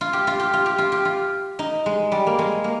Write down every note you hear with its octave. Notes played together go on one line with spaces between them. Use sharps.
F4
G4
F4
G4
F4
G4
F4
G4
F4
D#4
G#3
G3
A#3
G#3
A#3